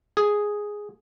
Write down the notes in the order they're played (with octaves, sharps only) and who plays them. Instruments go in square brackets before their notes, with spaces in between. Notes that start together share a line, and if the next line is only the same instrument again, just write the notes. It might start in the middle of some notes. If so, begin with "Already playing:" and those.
[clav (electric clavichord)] G#4